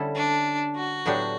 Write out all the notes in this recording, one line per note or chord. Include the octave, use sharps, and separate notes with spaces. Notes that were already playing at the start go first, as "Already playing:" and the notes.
Already playing: D3 G3 C#4 E4 A4
D4
F#4
A2 F#3 B3 D4 G4